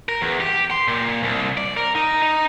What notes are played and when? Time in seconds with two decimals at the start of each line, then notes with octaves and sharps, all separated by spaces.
0.09 A#4
0.21 E2
0.40 G4
0.71 C6
0.88 A#2
1.23 C2
1.57 D5
1.77 A#4
1.95 D#4
2.22 D#4